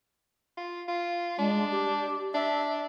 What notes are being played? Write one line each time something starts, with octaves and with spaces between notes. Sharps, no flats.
F4
F4
G#3 D4
G4
D4 E5